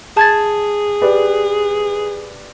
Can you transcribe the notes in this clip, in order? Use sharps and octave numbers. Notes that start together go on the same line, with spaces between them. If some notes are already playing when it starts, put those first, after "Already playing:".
G#4 A5 G#6 A6
G4 B4 D5